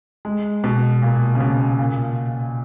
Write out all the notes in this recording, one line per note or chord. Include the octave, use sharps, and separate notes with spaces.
G#3
B2
A#2
C#3
B2
A#2